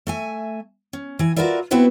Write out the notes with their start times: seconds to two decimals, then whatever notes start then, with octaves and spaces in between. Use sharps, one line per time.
0.07 A3 E5 G#5
0.93 C#4
1.19 E3 G#5
1.36 F4 F#4 A#4 B4 D5 E5
1.71 B3 C4 E4 F#4 B4 C5